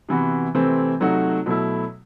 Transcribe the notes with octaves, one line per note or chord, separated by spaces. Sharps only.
C3 E3 B3 F#4
C3 E3 A3 C4
C3 F#3 A3 D#4 F#4
B2 F#3 A3 E4